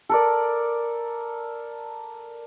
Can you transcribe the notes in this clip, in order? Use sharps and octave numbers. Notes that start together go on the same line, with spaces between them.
A4 A#4 D5